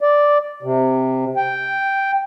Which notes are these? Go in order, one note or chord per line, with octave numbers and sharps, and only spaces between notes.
D5
C3
G5